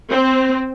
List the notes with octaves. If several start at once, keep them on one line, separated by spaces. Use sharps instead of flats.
C4